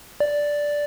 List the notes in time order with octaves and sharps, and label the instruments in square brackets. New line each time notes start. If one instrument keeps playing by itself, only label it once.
[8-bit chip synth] D5